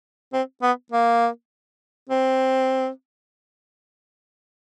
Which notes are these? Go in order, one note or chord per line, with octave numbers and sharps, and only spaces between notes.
C4
B3
A#3
C4